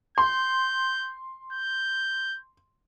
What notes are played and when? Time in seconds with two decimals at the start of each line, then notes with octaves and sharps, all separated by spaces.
0.18 C6 G6
1.53 G6